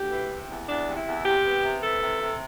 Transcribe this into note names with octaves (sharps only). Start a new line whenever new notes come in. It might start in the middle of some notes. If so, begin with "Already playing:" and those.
Already playing: D2 G4
E3
C3
E2
E2 D4
C3
E4
E2
C3 G4
B3
C3
E3 A4
C3
C3